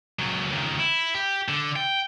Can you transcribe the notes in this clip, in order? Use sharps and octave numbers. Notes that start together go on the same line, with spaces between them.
C#2 F#3
C#2 D#3
E4
G4
D3
G5